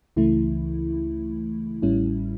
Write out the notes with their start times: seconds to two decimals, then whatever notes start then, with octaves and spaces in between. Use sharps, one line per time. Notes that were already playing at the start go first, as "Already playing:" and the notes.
0.16 C#2 C#3 E3 A3 E4
1.82 A1 A2 G3 C#4 E4